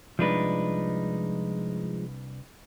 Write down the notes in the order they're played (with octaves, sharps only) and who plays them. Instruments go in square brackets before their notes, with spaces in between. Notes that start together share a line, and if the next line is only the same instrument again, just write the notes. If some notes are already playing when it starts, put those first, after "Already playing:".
[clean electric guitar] C2 D4 B4 [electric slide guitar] F3 G#3 D#4